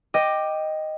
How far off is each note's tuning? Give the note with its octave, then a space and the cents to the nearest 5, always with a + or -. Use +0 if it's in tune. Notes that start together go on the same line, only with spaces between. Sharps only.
D#5 +0 G5 +0 D6 +15